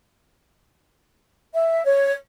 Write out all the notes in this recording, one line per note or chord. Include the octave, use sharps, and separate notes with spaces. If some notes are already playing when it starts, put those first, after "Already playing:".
E5
C#5